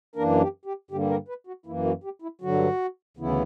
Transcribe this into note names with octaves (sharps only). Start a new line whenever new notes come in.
F#2 E3 A#3 D4 A#4
G4
G4
G2 D3 G3 A#3 G4
A#4
B4
F#4
F#2 E3 A#3 E4
F#4
G4
E4
G2 D3 F#3 F#4
D2 C#3 E3 B3 E4